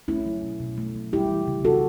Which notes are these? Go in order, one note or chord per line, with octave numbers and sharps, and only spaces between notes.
A3 C#4 E4
F#3
B2
B2
A3
F#3
G3 E4 G4
E3
C#3
C#3 F#4 A4